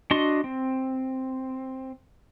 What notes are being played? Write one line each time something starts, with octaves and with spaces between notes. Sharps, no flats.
D4 F#4 D#5 C6
C4